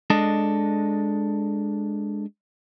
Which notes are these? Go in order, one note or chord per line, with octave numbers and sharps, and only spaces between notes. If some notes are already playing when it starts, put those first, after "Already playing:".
G#3 D4 A4 D#5